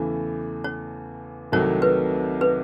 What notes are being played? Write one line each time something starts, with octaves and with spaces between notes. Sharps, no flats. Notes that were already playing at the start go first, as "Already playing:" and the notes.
Already playing: E2 C#3 E3 A3
C#5
C2 C3 D#3 F#3 A3 C#5
B4
B4